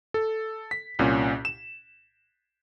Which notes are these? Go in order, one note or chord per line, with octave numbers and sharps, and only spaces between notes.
A4
B6
C2 A#2 C#4
E7